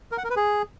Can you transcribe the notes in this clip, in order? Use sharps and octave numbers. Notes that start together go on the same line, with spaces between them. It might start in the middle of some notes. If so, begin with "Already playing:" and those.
A#4
F#5
A#4
B4
G#4